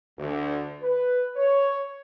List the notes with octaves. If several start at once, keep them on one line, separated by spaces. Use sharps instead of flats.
D2
B4
C#5